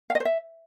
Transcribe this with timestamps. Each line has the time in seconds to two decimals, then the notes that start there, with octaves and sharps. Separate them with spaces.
0.10 F5
0.15 D#5
0.20 C5
0.25 E5